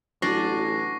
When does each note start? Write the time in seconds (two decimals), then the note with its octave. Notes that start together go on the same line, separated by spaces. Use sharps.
0.22 A1 E3 F#3 D4 F#4 C#6 A#6 C7